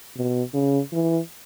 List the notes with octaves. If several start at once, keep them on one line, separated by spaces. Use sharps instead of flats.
B2
C#3
E3